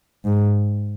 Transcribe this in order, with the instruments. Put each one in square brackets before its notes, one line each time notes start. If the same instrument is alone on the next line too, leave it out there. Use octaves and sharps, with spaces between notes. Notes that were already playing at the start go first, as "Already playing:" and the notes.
[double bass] G#2